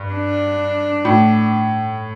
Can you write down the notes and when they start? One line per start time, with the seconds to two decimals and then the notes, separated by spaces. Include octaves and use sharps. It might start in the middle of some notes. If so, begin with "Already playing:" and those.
Already playing: G2
0.12 D4
1.05 A2